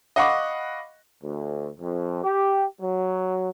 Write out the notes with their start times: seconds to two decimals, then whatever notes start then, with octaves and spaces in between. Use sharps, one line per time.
0.16 D#5 F5 F#5 B5 C#6 D6
1.23 D2
1.80 F2
2.24 G4
2.80 F#3